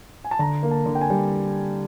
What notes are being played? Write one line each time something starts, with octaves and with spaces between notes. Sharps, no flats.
G#5
A5
D3 A#5
A#3
A5
D3
G5
G#5
G3